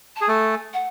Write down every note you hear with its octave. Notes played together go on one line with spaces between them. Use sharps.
A5
G#4
A3 A4 G#5
F#5